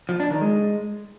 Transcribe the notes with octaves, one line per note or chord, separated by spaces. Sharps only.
F3
D4
D#3
G#3